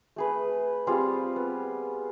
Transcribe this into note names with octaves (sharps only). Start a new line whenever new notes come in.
A3 G#4 B4
G3 C4 F4 G#4
B3